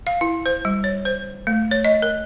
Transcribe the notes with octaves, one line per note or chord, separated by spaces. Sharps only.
F5
E4
C5
G3
C#5
C5
A3
C#5
D#5
A#4